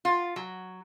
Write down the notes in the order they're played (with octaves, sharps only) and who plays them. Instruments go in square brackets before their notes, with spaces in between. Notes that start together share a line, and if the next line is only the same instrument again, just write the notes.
[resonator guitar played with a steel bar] F4
F#3